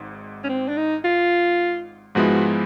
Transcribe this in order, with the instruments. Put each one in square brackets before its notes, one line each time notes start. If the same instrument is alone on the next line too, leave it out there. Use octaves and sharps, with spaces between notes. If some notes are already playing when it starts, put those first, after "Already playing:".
Already playing: [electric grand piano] G#1 G#2
[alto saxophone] C#4
C4
D4
D#4
F4
[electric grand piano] G#2 F3 G#3 B3 E4 [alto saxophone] F#4